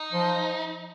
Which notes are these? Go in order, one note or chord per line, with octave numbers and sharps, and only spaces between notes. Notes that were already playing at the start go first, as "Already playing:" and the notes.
Already playing: D#4
F3